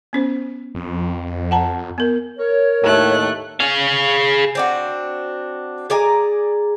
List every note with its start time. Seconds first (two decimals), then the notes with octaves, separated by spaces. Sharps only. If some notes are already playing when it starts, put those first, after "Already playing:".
0.13 B3 C#4 C5
0.75 F2
1.51 F#5 A5 A#5
1.98 B3 A#4
2.39 A#4 C#5
2.83 D#2 A2 A3 F#6
3.60 G#4 F5
4.55 C4 D4 F#4
5.90 G#4 D5 G#5 A#5